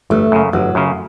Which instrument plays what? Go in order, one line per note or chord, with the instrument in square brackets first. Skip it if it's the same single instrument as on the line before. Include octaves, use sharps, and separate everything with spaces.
[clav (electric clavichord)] G1 [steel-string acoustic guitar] A3
[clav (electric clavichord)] F#2 C#3
[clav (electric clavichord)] G1 [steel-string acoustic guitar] F#3
[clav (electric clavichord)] F#2 C#3